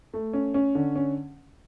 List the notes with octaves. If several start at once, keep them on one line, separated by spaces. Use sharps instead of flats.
A3
C#4
C#4
D3
C#4